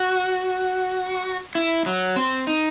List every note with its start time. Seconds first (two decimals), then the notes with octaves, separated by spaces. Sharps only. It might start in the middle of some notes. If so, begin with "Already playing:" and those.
Already playing: F#4
1.55 E4
1.86 F#3
2.16 C4
2.47 D#4